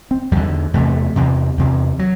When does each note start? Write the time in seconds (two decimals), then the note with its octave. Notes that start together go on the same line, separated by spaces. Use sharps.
0.11 C4
0.31 E2 D3 G3
0.74 E2 C3 A3
1.16 E2 C3
1.58 E2 C3
1.99 F#3